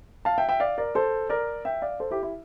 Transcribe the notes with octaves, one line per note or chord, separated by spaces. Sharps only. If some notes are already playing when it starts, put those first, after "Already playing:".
F5 A5
E5 G5
E5 G5
D5 F5
A#4 D5
A4 C5
A#4 D5
E5 G5
D5 F5
A4 C5
E4 G4
E4 G4